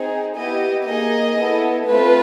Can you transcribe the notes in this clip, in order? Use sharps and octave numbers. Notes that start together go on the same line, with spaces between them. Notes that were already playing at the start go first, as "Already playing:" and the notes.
Already playing: C4 D#4 G#4
B3 E4 G4 D#5
A#3 D#4 G#4 D#5
B3 E4 A4
A3 C4 F4 B4